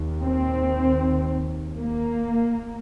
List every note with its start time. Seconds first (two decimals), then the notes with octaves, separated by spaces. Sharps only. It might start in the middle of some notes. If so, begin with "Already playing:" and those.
Already playing: D#2
0.22 C4
1.77 A#3